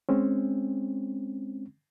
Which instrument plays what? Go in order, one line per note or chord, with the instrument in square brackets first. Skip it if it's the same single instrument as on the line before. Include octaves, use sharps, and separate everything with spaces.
[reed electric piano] G#3 C4 C#4